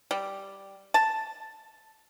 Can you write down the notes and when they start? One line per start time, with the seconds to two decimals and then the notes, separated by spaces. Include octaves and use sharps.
0.11 G3
0.94 A5